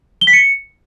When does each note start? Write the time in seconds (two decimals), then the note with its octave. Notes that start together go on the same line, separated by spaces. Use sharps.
0.21 G7
0.27 B6
0.33 C#7